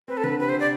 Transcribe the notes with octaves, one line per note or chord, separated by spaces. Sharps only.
C4 B4
A4
D3 B4
C3 B4
C5
C3 D5